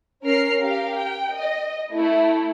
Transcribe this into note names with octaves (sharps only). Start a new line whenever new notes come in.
C#4 A#4 F6 C7
G4 A#4 F5
G5
D#5
A3 E4